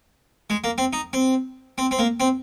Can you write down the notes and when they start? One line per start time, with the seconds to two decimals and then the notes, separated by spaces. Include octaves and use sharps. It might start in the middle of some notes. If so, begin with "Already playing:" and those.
0.50 G#3
0.64 A#3
0.78 C4
0.93 D#4
1.13 C4
1.78 C4
1.91 C4
1.99 A#3
2.20 C4